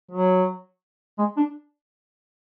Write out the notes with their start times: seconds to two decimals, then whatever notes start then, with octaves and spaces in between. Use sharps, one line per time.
0.11 F#3
1.18 G#3
1.37 D4